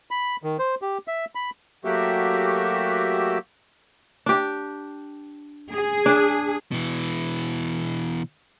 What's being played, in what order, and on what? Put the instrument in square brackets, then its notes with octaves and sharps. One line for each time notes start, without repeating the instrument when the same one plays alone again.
[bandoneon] B5
D#3
C5
G4
E5
B5
[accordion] F#3 A3 A#3 F#4 G4 E5
[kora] D4 G4
[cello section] G#4
[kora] D4
[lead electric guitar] B2 E3